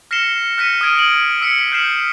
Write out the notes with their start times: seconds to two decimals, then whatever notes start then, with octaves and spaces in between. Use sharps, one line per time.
0.11 F6 A#6 C7 C#7 E7 G7
0.57 F6 F#6 A#6 B6 C#7 D#7
0.81 D#6 F6 G#6 D7 D#7
0.95 D#6 D7 F#7
1.41 E6 B6 C#7
1.72 F6 G6 C7 E7 F#7